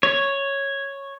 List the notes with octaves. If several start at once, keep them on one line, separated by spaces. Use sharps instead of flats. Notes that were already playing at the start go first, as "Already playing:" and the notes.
C#5